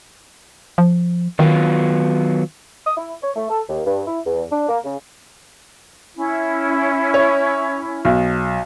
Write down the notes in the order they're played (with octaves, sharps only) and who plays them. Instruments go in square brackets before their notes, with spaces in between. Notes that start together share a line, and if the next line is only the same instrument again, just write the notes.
[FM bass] F3
[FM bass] D#3 [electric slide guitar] F#3 B3 F4
[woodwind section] D#6
E4
C#5
A3
A4
D#2
G2
E4
E2
D4
A#3
C#3
[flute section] C#4 E4
[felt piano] C#5
B1